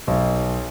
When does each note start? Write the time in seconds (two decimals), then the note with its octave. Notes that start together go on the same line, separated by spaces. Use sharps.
0.07 B1